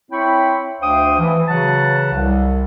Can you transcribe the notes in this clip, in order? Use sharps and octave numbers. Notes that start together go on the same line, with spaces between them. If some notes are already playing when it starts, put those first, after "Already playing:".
C4 E4 C#5 G5 B5 C#6
D2 D4 C5 F5 G5 D#6
E3
C#3 E3 F#3 F#4 F#5 A5
C2